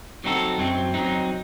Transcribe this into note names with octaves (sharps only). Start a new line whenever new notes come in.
F#3 C4 D#4 F#4 A4
F#2 F#3 C4
F#3 C4 D#4